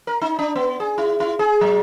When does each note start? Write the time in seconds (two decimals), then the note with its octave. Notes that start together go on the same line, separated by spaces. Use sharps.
0.07 A#4
0.22 D#4
0.39 D4
0.56 B3
0.80 G#4
0.98 E4
1.20 E4
1.39 G#4
1.61 F#3